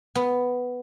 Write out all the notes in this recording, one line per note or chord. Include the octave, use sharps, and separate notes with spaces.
B3